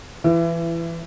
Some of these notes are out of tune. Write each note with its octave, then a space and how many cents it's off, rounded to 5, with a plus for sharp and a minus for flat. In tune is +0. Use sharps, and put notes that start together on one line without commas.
E3 +20 E4 +30